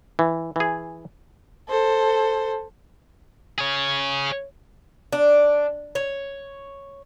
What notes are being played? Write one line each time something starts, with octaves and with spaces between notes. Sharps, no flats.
E3
E3 G#4
A4 C5
G#4 C#5
D4
C#5